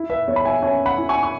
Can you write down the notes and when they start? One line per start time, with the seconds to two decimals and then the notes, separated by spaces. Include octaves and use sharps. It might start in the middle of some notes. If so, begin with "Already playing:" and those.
Already playing: E4
0.10 B4 E5
0.28 E2 C#5
0.36 B5
0.45 E5 G#5
0.62 C#4 E5 G#5
0.86 F#5 B5
0.97 E4
1.09 G#5 C#6
1.23 C#6